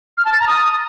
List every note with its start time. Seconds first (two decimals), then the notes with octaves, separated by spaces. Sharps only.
0.18 F6
0.25 A5
0.32 A6
0.40 A#5
0.47 D#6